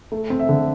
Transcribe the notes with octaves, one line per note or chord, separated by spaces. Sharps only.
A3
C4
E5
D3